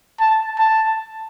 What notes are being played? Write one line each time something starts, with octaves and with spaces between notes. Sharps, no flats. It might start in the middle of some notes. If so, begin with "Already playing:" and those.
A5
A5